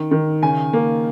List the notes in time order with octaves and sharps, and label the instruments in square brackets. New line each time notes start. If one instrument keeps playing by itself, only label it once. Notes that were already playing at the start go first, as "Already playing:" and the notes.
Already playing: [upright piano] D#3
D#3
C#3 G#5
A#3